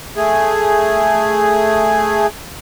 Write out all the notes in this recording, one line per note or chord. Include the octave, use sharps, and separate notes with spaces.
A3 G#4